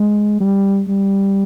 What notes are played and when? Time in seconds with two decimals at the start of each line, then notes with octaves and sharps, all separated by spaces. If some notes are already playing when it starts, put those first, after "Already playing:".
Already playing: G#3
0.41 G3
0.88 G3